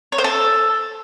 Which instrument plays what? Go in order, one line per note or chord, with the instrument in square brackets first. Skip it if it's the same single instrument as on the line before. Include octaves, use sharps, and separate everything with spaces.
[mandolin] C#5
C5
A4